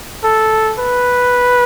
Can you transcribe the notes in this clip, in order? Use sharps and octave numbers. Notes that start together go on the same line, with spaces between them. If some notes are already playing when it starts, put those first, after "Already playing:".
A4
B4